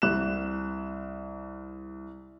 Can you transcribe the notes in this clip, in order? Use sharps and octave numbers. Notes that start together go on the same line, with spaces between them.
C2 F#6 E7